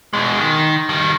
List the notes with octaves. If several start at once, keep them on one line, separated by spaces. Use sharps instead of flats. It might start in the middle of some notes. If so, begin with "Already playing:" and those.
B2 G#3
D#3
D#3 G3